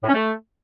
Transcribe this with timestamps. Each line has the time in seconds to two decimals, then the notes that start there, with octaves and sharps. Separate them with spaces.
0.03 A2
0.09 C#4
0.14 A3